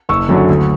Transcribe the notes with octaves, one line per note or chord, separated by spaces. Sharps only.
F#1 C#6 E6
F#2 D3 F#3
D2